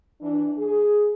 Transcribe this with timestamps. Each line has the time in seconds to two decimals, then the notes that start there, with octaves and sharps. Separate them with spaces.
0.21 E3 D4
0.58 G#4